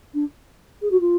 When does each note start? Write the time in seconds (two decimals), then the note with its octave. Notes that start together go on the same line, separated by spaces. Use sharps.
0.14 D4
0.82 G#4
0.91 F#4
1.00 F4